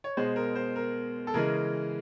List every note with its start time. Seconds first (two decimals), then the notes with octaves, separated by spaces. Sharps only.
0.04 C#5
0.17 B2 G#3 C5
0.36 A#4
0.56 C5
0.76 A#4
1.27 A4
1.34 C#3 E3 G#3 A#4